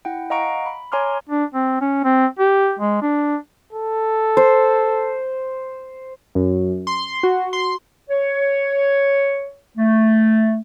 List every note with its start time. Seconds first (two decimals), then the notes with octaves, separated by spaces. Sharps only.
0.05 E4 F#5 G5
0.30 D#5 F5 F#5 A#5 C#6 D7
0.66 B5
0.92 C#5 G#5 A#5 C6 D6 F6
1.29 D4
1.54 C4
1.81 C#4
2.04 C4
2.39 G4
2.79 G#3
3.02 D4
3.73 A4
4.37 C5
6.35 F#2
6.87 C6
7.23 F#4
7.53 C6
8.10 C#5
9.77 A3